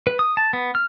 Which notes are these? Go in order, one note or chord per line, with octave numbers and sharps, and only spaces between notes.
B4
D#6
A5
B3
F6